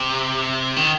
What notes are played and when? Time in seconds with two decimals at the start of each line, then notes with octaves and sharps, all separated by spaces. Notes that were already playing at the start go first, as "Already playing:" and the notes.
Already playing: C3
0.76 D#3